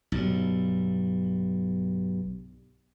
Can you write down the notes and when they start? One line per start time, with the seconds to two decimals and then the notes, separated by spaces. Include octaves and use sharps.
0.12 B1 G2